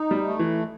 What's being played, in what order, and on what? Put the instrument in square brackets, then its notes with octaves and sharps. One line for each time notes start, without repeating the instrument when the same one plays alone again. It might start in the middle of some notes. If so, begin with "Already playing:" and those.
Already playing: [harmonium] D#4
[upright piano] G3
[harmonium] A3
[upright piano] E3